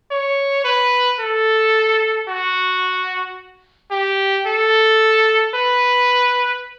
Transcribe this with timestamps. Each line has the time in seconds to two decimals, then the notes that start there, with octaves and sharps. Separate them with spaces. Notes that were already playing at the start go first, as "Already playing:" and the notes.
0.11 C#5
0.65 B4
1.20 A4
2.28 F#4
3.91 G4
4.47 A4
5.55 B4